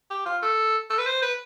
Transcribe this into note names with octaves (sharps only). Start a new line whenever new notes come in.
G4
F4
A4
A4
B4
C5
B4